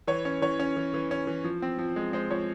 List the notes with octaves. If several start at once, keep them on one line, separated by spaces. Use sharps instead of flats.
E3 C#5
C#4
E3 C#5
C#4
E3
E3
C#4
E3
F3
C4
F3
G#3
G#3 C5
F3 C#5